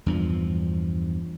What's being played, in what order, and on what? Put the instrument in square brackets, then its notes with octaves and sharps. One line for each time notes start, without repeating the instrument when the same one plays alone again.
[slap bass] E2 G2 F3